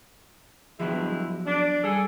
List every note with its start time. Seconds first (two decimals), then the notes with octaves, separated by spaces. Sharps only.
0.80 G2 F3 F#3 G#3 B3 E4
1.46 D4
1.84 G3 G#4 A4